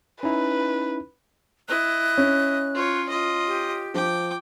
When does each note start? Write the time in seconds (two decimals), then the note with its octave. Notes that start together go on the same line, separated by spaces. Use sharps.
0.23 C#4 D#4 E4 B4
1.69 E4 D#5 F#6
2.18 C#4
2.74 F4 C#5
3.09 F4 D#5
3.47 G4
3.94 F3 G5 D6